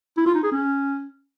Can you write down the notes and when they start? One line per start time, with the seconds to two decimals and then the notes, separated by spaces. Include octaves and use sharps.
0.17 E4
0.26 F4
0.35 D#4
0.43 G#4
0.52 C#4